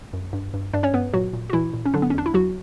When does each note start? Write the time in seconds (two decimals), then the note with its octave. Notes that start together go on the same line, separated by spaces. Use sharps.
0.13 F#2
0.33 G2
0.54 G2
0.73 G2 D4 D5
0.83 C#4 C#5
0.94 G2 B3 B4
1.13 A#2 F#3 F#4
1.33 A#2
1.50 F#4
1.53 A#2 E3 E4
1.74 A#2
1.85 C#4
1.94 D3 F#3 D4
2.02 B3
2.10 C#4
2.14 E2 D4
2.26 E4
2.34 E2 F#3 F#4